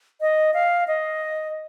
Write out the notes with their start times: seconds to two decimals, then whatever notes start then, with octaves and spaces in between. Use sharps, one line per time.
0.21 D#5
0.54 F5
0.88 D#5